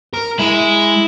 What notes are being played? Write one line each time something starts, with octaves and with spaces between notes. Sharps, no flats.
A#4
G#3 E4